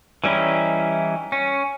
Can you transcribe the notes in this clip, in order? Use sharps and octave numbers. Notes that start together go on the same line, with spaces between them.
E3 G3 C#4 D#4 E4
C#4